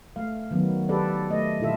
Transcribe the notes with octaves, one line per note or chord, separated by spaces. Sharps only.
A3 F5
D#3 F#3 B3
G4 A4 B4 D5
A3 D#5
A#2 D3 E4 F4 A4 E5